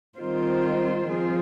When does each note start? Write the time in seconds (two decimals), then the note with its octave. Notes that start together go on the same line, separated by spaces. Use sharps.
0.19 D#3 G3 C4 F4 C5
1.08 F3 C4 F4 G#4